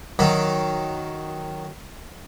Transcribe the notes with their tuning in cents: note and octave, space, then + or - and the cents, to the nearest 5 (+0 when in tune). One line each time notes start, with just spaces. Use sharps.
D#3 +0 F#3 +0